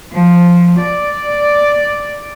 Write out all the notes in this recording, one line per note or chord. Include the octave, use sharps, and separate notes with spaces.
F3
D5